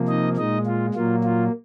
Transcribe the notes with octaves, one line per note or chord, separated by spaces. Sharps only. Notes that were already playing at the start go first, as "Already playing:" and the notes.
Already playing: C3 F3 A#3
D#4 D#5
A#2 G#3 D#4 D#5
F4
A#2 F#3 A#3 F4
F4